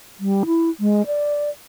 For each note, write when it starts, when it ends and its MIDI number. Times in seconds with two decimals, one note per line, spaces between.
0.20 0.44 55
0.46 0.69 64
0.80 1.06 56
1.06 1.50 74